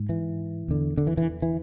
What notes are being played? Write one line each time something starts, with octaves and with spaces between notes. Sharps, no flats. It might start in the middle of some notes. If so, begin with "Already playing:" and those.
Already playing: G#2
E3
E2 D3
D3
E3
E3
E3